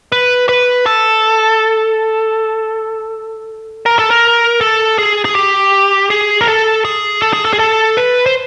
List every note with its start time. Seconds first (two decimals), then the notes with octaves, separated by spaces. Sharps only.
0.12 B4
0.49 B4
0.86 A4
3.86 A#4
3.99 A4
4.11 A#4
4.61 A4
4.98 G#4
5.25 G#4
5.35 G4
6.10 G#4
6.41 A#4
6.47 A4
6.85 G#4
7.22 A4
7.33 G#4
7.45 A4
7.53 G#4
7.59 A4
7.97 B4
8.26 C5